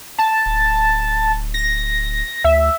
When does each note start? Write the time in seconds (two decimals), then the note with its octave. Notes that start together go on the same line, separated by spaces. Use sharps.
0.18 A5
0.46 D1
1.54 A#6
2.44 D2 E5